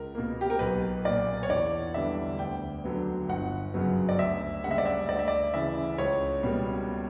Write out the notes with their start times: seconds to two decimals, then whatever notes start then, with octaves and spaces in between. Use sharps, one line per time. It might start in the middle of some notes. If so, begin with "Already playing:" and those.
Already playing: C#2 A#4
0.15 B2 A#3
0.41 G4
0.50 A#4
0.59 B1 B4
1.05 A#2 A#3 D5
1.43 C#5
1.50 E2 D5
1.94 D3 G3 B3 E5
2.39 D2 G5
2.84 D3 F#3 B3
3.28 G1 F#5
3.74 F#2 C#3 F#3 B3
4.09 D5
4.19 D2 E5
4.63 C#3 G3 A#3 F#5
4.71 E5
4.78 D5
4.85 E5
5.09 D2 D5
5.19 E5
5.28 D5
5.53 C#3 E3 E5
5.98 C#2 C#5
6.43 B2 G3 A#3